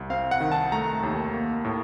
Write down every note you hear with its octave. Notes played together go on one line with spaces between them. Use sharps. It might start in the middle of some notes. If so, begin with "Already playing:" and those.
Already playing: C2
C4 F5
F#5
D#3
A5
A3 A#5
D#2
A#3
A2